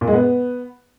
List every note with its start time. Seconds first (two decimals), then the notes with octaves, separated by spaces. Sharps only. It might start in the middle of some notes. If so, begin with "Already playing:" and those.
0.01 A#2
0.08 G#3
0.14 B3